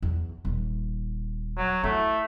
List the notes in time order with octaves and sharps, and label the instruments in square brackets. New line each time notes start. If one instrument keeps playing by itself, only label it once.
[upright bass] E2
D#1
[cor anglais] F#3
[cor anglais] A3 [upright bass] E4